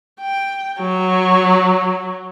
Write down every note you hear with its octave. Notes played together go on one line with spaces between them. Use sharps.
G5
F#3